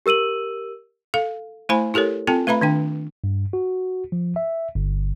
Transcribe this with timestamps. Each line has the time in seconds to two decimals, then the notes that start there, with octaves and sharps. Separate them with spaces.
0.06 G4 A#4 E6 D#7 F#7
1.14 A4 F5
1.69 A3 E4 C5 G#5 B5
1.94 E4 G4 A4 A#4 C#5
2.27 C4 F4 A4 G5 A5
2.47 A3 B4 E5 A#5 B5
2.61 D#3 D4 G5
3.24 G2
3.53 F#4
4.12 F3
4.36 E5
4.75 G1